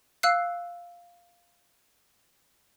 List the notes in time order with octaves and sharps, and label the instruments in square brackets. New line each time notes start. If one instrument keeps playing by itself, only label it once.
[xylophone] F5 E6 F#6 C7